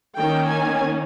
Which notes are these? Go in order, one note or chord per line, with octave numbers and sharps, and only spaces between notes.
D#3 A#3 C#4 G5
G#5